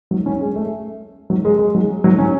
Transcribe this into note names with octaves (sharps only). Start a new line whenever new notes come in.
F#3
C#4
G#3
A3
F#3
G#3
G#3
F#3
F#3
C#4